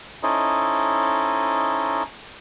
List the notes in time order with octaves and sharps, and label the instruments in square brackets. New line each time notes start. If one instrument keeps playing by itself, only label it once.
[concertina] C#4 D#4 E4 A4 C5 D#5